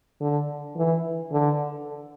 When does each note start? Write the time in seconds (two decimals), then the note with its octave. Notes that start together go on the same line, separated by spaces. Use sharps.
0.21 D3
0.76 E3
1.32 D3